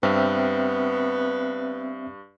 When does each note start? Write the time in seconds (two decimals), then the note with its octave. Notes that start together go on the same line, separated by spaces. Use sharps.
0.03 G2 B3 C4 E5 F6